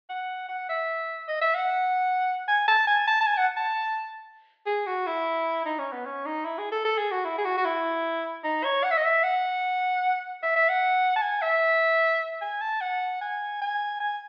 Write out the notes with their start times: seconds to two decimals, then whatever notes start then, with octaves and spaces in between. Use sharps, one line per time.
0.09 F#5
0.48 F#5
0.69 E5
1.28 D#5
1.41 E5
1.55 F#5
2.48 G#5
2.68 A5
2.87 G#5
3.07 A5
3.21 A5
3.27 G#5
3.37 F#5
3.56 A5
4.66 G#4
4.86 F#4
5.07 E4
5.65 D#4
5.79 C#4
5.92 B3
6.06 C#4
6.26 D#4
6.45 E4
6.58 G#4
6.72 A4
6.85 A4
6.98 G#4
7.11 F#4
7.25 E4
7.38 G#4
7.45 F#4
7.57 F#4
7.65 E4
8.44 D#4
8.64 C#5
8.84 F#5
8.91 E5
8.97 D#5
9.05 E5
9.23 F#5
10.43 E5
10.56 E5
10.69 F#5
11.16 A5
11.22 G#5
11.42 E5
12.41 G#5
12.61 A5
12.81 F#5
13.21 G#5
13.61 G#5
14.00 G#5